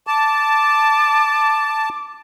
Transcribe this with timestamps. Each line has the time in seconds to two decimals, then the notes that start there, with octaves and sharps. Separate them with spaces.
0.07 A5 D6